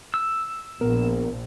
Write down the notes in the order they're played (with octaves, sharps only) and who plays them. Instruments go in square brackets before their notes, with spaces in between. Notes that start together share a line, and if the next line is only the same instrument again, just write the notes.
[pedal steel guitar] E6
[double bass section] A#1 [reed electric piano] B3 A#4